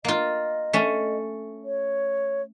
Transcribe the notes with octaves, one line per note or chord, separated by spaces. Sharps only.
A#3 F4 D#5
A3 C#4
C#5